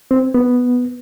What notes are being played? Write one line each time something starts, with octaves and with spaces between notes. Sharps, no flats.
C4
B3